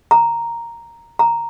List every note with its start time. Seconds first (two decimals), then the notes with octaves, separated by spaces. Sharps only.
0.11 A#5
1.19 A#5